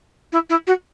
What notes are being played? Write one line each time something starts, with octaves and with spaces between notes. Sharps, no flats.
E4
E4
F#4